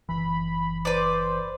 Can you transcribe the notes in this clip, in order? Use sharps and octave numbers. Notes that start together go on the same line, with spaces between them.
F#1 E3 B5
B4 C5 D5